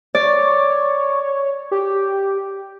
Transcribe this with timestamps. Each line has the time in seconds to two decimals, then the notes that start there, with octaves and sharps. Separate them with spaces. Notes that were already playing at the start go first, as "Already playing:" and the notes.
0.15 C#5 D5
1.71 G4